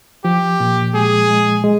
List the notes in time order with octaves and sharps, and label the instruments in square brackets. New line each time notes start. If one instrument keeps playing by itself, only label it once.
[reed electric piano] F3 [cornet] G4
[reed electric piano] A#2
[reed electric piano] G#3 [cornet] G#4
[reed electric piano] G#3
G#3